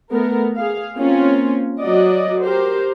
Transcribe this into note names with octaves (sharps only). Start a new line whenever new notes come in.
A3 B3 A#4
G#4 F5
A#3 C4 C#4 F4
F#3 F#4 D5 D#5
G4 A#4 C5